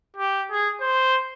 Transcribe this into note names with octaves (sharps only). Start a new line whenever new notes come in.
G4
G#4
C5